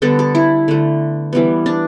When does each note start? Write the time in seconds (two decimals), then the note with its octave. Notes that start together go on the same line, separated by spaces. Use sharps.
0.02 D3 G3 B3 A4
0.19 A4
0.35 E4
0.68 D3 A3
1.33 E3 G3 B3
1.66 D4